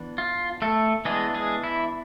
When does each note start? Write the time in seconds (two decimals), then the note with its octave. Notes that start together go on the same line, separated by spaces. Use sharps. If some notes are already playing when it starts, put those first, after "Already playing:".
Already playing: E3 B3 D4
0.18 F4
0.62 A3 A4
1.05 E3 G#3 B3 D4 G#4
1.34 G#3 G#4
1.64 E4